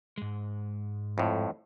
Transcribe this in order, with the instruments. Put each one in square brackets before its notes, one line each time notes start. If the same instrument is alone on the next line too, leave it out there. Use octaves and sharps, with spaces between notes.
[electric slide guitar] G#2 G#3
[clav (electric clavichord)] F2 A2